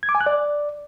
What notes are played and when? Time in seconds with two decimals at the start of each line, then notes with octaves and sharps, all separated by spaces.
0.03 G#6
0.09 D6
0.15 G#5
0.21 F#6
0.26 D5